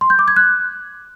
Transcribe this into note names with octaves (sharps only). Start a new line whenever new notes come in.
C6
G6
D6
G#6
F#6